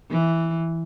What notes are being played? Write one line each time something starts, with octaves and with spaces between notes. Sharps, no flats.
E3